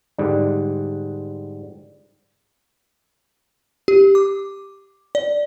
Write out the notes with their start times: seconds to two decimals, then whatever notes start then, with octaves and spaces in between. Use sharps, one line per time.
0.18 G#2 D3 G3
3.88 G4
4.15 D6
5.15 D5